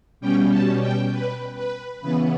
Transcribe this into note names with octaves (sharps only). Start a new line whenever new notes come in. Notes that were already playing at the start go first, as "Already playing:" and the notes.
B2 G3 C#4 G5
A5
G5
B4
B4
C#3 E3 B3 B4